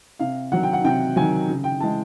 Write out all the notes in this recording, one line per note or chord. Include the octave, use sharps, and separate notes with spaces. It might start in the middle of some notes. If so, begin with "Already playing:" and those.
C3 F5
D#3 F#3 F#5
G5
F#5
C3 G5
D#3 F#3 G#5
C#3
G5
E3 G#3 A5